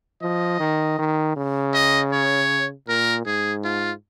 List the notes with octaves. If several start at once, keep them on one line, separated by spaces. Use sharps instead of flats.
F3 D#5
D#3
D#3
C#3
D#5
C#5
A#2 A#4
G#2 G#4
F4